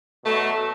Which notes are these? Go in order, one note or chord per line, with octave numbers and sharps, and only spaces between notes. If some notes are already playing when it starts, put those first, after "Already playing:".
B2 F#3 A3